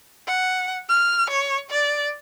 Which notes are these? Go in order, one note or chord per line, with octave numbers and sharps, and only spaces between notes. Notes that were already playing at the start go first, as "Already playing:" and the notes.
F#5
F6
C#5
D5